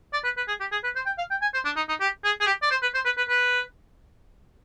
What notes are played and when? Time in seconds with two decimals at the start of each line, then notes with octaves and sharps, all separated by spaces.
0.13 D5
0.24 B4
0.37 B4
0.48 G#4
0.60 G4
0.72 G#4
0.84 B4
0.95 C5
1.06 G5
1.18 F5
1.30 G5
1.41 G#5
1.54 C5
1.65 D4
1.76 D#4
1.88 D#4
2.00 G4
2.24 G#4
2.40 G#4
2.46 G4
2.62 D5
2.71 C5
2.82 B4
2.94 C5
3.05 B4
3.17 B4
3.28 B4